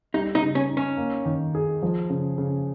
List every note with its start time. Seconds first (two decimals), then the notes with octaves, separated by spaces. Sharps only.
0.14 G3 D#4
0.35 D#4
0.41 C#3
0.55 C#4
0.69 D#4
0.77 C#4
0.97 A#3
1.25 D#3
1.55 G#4
1.83 F3
2.10 C#3
2.38 C#3